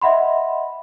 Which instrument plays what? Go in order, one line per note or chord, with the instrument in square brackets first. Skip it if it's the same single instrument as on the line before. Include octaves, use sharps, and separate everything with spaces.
[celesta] D#5 E5 F#5 B5 C6